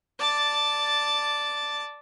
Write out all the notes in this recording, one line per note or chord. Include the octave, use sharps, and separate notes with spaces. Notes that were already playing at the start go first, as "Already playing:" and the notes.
D5 A5